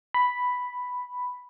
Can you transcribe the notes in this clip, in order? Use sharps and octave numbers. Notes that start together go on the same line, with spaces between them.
B5